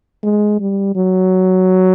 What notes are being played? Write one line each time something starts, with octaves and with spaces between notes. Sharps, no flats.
G#3
G3
F#3